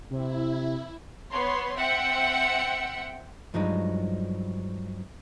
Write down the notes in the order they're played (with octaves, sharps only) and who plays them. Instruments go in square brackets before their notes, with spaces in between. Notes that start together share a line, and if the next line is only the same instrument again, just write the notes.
[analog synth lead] C3 [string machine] E4
[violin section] B3 C#5 C6
C4 E5 F#5 G5 C#7
[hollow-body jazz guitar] G2 F3 F#3 G#3 D#4